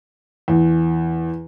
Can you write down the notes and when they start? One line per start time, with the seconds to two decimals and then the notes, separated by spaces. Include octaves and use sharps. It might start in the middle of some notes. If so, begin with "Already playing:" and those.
0.48 E2